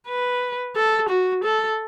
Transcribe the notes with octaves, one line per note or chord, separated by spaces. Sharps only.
B4
A4
F#4
A4